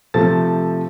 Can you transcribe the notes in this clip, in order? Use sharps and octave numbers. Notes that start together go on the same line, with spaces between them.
C3 F3 A3 A4 A5 A6